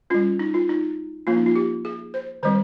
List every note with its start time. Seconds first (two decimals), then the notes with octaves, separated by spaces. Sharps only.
0.10 G3 C#4 F4
0.39 D#4
0.54 F4
0.69 D#4
1.27 F3 A#3 C#4 F4
1.37 D#4
1.46 F4
1.56 G4
1.85 G#4
2.14 C5
2.43 D#3 G3 C4 C5